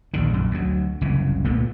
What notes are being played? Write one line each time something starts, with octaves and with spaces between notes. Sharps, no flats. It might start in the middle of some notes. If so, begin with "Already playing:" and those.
A#1 D#2 D3
A#1 F#2
D2 F#3
F#1 C2 C#3 E3
D2 A#2 A3 B3